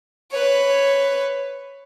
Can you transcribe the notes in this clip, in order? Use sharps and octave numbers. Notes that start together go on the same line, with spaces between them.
B4 C#5